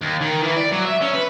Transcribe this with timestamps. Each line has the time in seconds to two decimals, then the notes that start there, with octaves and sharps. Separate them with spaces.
0.02 D#2
0.21 D#3
0.43 E3
0.57 D5
0.72 F#3
0.85 E5
1.01 C#4
1.14 B4